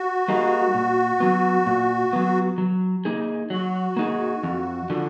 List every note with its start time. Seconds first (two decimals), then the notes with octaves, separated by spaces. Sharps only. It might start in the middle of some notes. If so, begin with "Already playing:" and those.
Already playing: F#4
0.28 G3 A#3 D#4 G#4
0.74 A#2
1.20 F#3 B3
1.66 A#2
2.13 F#3 B3
2.58 F#3
3.05 A#3 D#4 G#4
3.50 F#3 F#4
3.97 A#3 D#4 G#4
4.43 F2
4.90 D3 F3